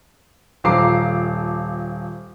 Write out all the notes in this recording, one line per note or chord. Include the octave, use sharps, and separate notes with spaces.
D#1 F3 A#5 D6 C7